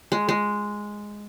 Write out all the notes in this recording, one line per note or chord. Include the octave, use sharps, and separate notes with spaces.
G#3
G#3